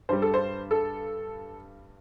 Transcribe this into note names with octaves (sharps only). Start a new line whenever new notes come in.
G2 G3 C5
A4
C5
A4